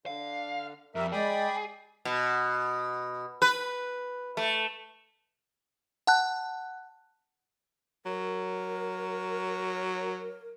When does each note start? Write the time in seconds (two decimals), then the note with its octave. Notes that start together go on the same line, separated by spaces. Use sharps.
0.06 D3 F5
0.95 F2 G3 A#4 E5
1.12 G#3 G#4 D5 G5 B5
2.05 B2
3.42 B4
4.37 A3
6.07 F#5 A5 F#6
8.06 F#3 A#4